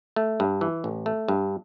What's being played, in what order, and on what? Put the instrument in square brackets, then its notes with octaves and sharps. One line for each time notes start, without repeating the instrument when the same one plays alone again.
[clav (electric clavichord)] A3
G2
E3
A1
A3
G2